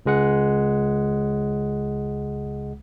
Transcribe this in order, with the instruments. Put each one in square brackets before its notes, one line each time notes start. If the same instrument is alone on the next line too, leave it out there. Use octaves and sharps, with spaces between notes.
[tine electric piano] C#2 G#3 F#5